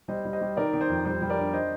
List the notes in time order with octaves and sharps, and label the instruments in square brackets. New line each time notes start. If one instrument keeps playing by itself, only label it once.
[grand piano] G3 C5 D#5
G3
C5 D#5
G3
D#3 A#4 D5
D#3
C5
F2
G3 C5
G3
A#4 D5
D4
C5 D#5